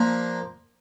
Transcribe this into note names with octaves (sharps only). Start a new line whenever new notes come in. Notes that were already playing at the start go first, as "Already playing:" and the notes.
Already playing: F3 A#3 D4